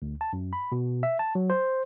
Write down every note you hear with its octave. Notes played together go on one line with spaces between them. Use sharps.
D2
A5
F#2
B5
B2
E5
A5
F#3
C5